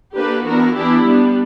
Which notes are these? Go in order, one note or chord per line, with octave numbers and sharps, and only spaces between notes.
D3 A#3 D4 G4 B4
E3 B3 D4 F#4 A#4
E3 B3 D4 E4 G4
G3 B3 D4